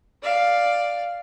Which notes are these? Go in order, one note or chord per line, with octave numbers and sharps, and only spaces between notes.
D5 F5